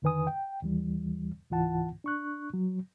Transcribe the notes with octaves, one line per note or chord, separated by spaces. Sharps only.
F2 D3 D#3 B4 G#5 D#6
G5
D#2 E3 G3
C#2 G#2 E3 F4 F#5 A5
D4 C#6 F#6
F#3